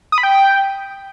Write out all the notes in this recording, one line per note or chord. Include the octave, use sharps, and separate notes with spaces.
D#6
B5
G5